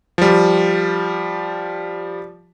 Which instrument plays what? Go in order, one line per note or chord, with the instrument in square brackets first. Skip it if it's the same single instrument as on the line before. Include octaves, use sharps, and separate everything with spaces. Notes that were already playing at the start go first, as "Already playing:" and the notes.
[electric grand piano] F3 G3